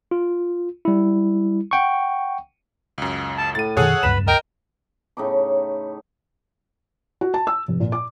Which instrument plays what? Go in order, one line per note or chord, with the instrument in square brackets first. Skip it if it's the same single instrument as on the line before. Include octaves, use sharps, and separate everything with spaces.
[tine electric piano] F4
G3 E4
F#5 G5 C#6
[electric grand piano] C#2 F#2
[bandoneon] A5
[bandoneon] A2 [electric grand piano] A6 D#7
[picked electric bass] F#2 B2 D#3 [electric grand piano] G#4 A4 C#5 [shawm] F#5
[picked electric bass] D1 C#2 G2 [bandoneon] B4 B5 [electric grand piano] E7
[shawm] A#4 [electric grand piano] D#5 [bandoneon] G5
[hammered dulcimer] A2 C#3 D#4 D6
[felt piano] F#4
A5
E6
F1
A#2
D6